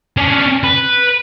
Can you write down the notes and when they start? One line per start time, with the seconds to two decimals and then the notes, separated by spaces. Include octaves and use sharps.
0.17 C#4 D4
0.63 B4